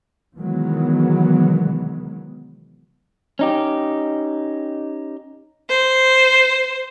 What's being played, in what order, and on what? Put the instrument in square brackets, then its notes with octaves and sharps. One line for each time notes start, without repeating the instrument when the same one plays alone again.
[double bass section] C3 D#3 E3 F#3 G#3 B3
[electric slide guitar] C#4 D#4 G4
[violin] C5